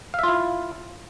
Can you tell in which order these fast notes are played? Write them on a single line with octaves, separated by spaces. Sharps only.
F5 E5 F4 E4